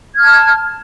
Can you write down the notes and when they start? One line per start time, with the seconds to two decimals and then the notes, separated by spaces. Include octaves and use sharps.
0.14 G#6
0.17 F6
0.20 A5